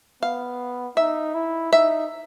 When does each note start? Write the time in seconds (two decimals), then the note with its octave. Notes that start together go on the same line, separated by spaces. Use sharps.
0.22 B3 F5
0.97 D#4 E5
1.34 E4
1.73 D#4 E5